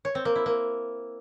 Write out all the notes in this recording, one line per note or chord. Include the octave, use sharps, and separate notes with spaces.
C#5
C4
A#3
E4
A#3